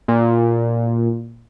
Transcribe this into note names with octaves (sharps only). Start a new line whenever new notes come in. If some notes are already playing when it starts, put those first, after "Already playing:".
A#2